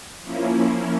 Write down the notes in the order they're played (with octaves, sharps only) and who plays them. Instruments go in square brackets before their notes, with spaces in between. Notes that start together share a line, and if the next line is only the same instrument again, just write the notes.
[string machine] F3 A#3 C#4 E4